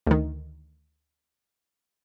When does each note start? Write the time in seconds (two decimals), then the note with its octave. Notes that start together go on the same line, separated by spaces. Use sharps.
0.07 D2 D#3